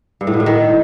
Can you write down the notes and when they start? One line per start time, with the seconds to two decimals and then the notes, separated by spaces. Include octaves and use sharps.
0.21 G2
0.27 A2
0.34 B2
0.40 A2
0.46 D#3